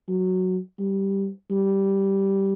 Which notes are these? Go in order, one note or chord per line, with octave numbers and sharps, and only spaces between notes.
F#3
G3
G3